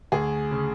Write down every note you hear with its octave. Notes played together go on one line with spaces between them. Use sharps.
D2 G#4
C#3